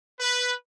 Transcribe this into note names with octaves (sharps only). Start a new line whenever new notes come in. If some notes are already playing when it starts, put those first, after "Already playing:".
B4